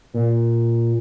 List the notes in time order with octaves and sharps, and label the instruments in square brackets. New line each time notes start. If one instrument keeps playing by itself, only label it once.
[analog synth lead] A#2